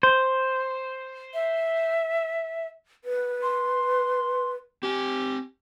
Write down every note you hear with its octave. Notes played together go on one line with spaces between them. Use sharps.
C5
E5
B4
C6
C4 G4 G#5